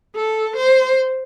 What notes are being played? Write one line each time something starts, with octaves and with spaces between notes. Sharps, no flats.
A4
C5